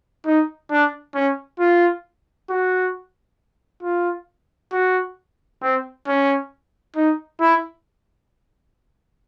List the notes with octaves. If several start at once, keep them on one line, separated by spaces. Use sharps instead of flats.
D#4
D4
C#4
F4
F#4
F4
F#4
C4
C#4
D#4
E4